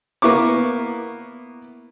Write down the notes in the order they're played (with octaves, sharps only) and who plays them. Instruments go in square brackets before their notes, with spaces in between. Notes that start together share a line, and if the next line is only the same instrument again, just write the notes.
[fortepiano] A#3 B3 E4 C#6 D6